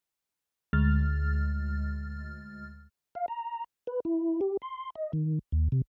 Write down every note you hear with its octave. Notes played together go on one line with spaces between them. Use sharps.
D2 G#3 F6 A6
F5
A#5
B4
E4
G4
C6
D#5
D#3
D#2
C3